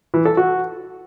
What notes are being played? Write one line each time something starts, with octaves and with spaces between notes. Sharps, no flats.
E3
A4
F#4